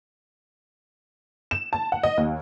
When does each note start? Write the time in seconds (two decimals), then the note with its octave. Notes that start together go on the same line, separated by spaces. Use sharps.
1.51 E7
1.73 A5
1.92 F#5
2.03 D#5
2.17 D#2